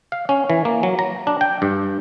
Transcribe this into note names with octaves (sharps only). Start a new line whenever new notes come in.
F5
C#4
E3
A#3
F#3
A#5
D4
G5
G2